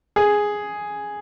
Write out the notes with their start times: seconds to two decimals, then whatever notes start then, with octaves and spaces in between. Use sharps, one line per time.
0.16 G#4